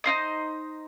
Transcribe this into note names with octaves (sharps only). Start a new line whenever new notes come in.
D#4 F4 C5 D#5